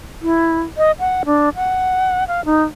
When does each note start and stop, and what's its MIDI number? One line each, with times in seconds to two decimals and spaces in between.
0.22 0.61 64
0.77 0.92 75
0.99 1.23 78
1.26 1.49 62
1.56 2.24 78
2.28 2.44 77
2.45 2.63 63